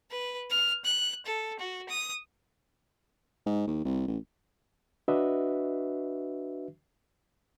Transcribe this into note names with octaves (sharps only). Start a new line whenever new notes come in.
B4
F6
F#6
A4
F#4
D#6
G#2
D#2
C2
A1
D4 F#4 B4 D#5 E5